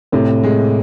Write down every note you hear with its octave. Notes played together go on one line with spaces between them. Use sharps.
A2 C3
G#3